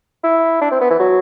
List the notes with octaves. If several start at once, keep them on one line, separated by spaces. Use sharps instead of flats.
E4
D4
C4
B3
E3
F#3